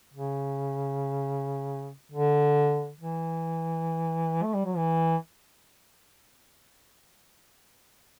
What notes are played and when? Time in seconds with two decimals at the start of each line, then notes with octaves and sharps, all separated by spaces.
0.14 C#3
2.12 D3
3.00 E3
4.43 A3
4.54 G3
4.65 F#3
4.77 E3